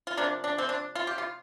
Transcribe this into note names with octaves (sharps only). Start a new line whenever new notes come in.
F4
C3 F3 A#3 D4
D4
C4
D4
F4
G4
F4